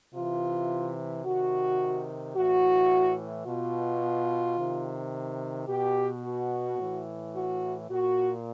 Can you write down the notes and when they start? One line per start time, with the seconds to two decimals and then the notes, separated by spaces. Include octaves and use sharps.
0.15 C3 E3 F4
1.25 C3 D#3 F#4
2.36 A2 E3 F#4
3.47 B2 F4
4.58 C3 D#3
5.68 B2 G4
6.25 F#4
6.79 A2 E3
7.35 F#4
7.90 A#2 F#4